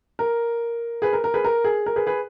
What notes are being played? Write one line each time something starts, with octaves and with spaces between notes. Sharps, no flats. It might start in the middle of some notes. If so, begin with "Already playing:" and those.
A#4
G#4 B4
A#4
A#4
G#4 B4
A#4
G#4
A#4
G#4 B4
G#4 B4